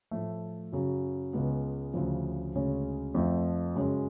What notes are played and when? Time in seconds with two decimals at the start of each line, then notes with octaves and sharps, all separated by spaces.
0.11 A2 F3 A3
0.72 F#2 C#3 F#3
1.33 C#2 C#3 G#3 B3
1.94 D2 C#3 F3
2.54 D2 C#3 G#3 C#4
3.15 F2 F3 A3
3.75 F#2 C#3 G#3 C#4